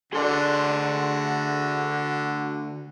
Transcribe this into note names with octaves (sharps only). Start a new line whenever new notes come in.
D2 D3 F#4 G#4 A4 D5 C6